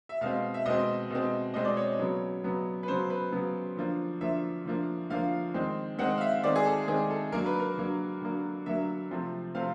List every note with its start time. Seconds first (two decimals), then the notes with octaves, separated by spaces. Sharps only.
0.09 E5
0.21 B2 G#3 C4 F5
0.54 E5
0.66 B2 G#3 C4 D#5
1.10 B2 G#3 C4
1.54 B2 G#3 C4 D#5
1.65 D5
1.77 C#5
1.99 C#3 F#3 B3
2.44 C#3 F#3 B3
2.83 B4
2.88 C#3 F#3 B3 C5
3.10 B4
3.32 C#3 F#3 B3
3.77 D3 F3 A#3
4.21 D3 F3 A#3 E5
4.65 D3 F3 A#3
5.10 D3 F3 A#3 F5
5.54 D#3 G#3 C4
5.99 D#3 G#3 C4 F#5
6.18 F5
6.21 E5
6.44 D#3 G#3 C4 D5
6.56 G#4
6.66 A4
6.88 D#3 G#3 C4 G#4
7.10 A4
7.32 D3 F#3 A#3 A#4
7.46 B4
7.60 A#4
7.77 D3 F#3 A#3
8.21 D3 F#3 A#3
8.66 D3 F#3 A#3 E5
9.11 C3 F3 A3 C4
9.55 C3 F3 A3 C4 F5